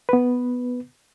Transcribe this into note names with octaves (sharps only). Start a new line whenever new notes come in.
B3 B4